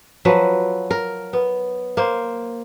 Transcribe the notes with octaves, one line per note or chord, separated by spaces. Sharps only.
F3 F#3 B4
A#4
B3
A#3 C5